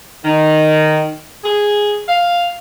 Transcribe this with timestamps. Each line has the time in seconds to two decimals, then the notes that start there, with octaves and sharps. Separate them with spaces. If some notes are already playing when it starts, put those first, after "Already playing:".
0.24 D#3
1.44 G#4
2.07 F5